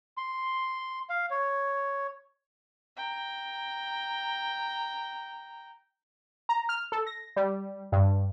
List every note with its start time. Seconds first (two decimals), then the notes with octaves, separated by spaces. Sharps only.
0.17 C6
1.09 F5
1.31 C#5
2.97 G5 A#5
6.49 A#5
6.69 F6
6.92 A4
7.07 A#6
7.36 G3
7.92 G2